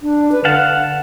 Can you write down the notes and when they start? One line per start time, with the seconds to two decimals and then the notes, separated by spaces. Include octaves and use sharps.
0.02 D4
0.32 B4
0.45 D3 F5 F#5 A5